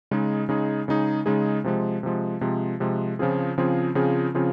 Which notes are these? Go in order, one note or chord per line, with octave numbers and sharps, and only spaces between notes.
C#3 G#3 D#4 G#4
C#3 G#3 D#4 G#4
C#3 G#3 D#4 G#4
C#3 G#3 D#4 G#4
C3 F3 G#3
C3 F3 G#3
C3 F3 G#3
C3 F3 G#3
C#3 F3 C4 F4 G#4
C#3 F3 C4 F4 G#4
C#3 F3 C4 F4 G#4
C#3 F3 C4 F4 G#4